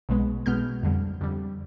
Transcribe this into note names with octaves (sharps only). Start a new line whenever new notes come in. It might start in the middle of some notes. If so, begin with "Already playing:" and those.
B1 B2 G#3 B3
B1 B2 G#3 B3 F6 G6
F2 D3 G3
F2 D3 G3